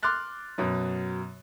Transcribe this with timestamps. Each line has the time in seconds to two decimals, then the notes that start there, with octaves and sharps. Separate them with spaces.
0.03 C6 D6 F6 F#6 A6
0.58 F#2 B2